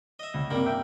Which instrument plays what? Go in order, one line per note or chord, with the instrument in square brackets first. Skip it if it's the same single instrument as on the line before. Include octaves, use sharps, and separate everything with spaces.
[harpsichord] D#5 E5
[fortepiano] C#2
[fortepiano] G2 C3 [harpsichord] G3 A#3
[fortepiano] E5 G5